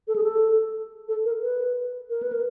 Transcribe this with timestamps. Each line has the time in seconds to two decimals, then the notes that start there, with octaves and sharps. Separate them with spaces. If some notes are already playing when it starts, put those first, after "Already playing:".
0.08 A4
0.16 G#4
0.23 A4
1.08 A4
1.25 A#4
1.42 B4
2.10 A#4
2.23 B4
2.33 A#4